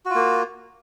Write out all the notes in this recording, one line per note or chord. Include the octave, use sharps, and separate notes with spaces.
A#3 F4 F#4